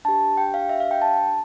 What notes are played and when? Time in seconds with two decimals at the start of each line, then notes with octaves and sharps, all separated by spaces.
0.05 D4 G4 A5
0.37 G5
0.54 F5
0.69 E5
0.80 F5
0.91 G5
1.02 A5